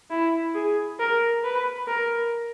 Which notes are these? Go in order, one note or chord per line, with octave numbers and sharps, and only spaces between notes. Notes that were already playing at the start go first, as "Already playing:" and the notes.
E4
G#4
A#4
B4
A#4